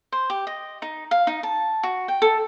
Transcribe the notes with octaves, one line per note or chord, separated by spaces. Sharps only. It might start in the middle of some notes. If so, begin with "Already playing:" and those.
C5
G4
D#5
D#4
F5
D#4
A5
F#4
G5
A4